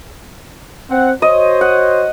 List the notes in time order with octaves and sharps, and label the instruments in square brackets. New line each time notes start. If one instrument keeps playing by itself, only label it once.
[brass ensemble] C4 F#5
[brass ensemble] F#4 C5 C#5 [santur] D#5
[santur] F#5